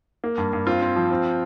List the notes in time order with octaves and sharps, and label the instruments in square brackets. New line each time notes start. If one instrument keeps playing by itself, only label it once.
[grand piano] A#3
G2
G2
C4 F4
C4
F3
C4